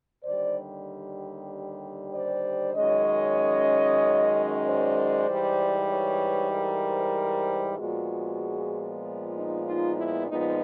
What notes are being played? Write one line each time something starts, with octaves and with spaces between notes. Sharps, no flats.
D#2 D3 G3 C5 D5
C5 D5
F#2 D#3 G#3 C#4 C#5 D#5
C5 D5
G#2 E3 G3
B4 C#5
A#4 C5
A#2 F3 G#3 B3 F#4 G#4
D#4
D#4 F4
E4
A#2 F3 G#3 B3 D#4